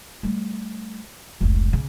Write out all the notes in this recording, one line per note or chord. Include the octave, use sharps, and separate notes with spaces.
G3 A3
F1 C#2
C#3